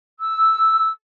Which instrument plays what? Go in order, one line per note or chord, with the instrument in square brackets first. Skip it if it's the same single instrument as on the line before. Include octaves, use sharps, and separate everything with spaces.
[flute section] E6